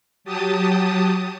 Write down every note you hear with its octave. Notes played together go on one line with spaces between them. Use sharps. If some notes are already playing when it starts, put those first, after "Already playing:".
F#3 G4 A5 D#6